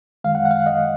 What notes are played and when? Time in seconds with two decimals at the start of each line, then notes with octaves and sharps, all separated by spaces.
0.24 F#2 D#3 G#3 F5
0.35 F#5
0.45 F#5
0.51 F5
0.56 F#5
0.66 D#5